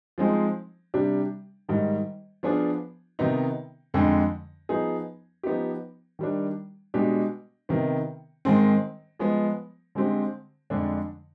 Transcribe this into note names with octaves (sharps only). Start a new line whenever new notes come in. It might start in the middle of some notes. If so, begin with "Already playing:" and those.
F3 G#3 C4 D#4 G#4
C3 G3 D4 G4
G#2 D#3 G3
F3 B3 D4 F4 G#4
C3 D#3 B3 D#4
F2 D3 G#3
F3 B3 D#4 G#4
F3 B3 D#4 G4
D#3 G3 D4
B2 G#3 D4 G4
C3 D#3 B3
G#2 D#3 G#3 C4
F3 G#3 B3
D3 G#3 C4 G4
F2 D3 G#3 D4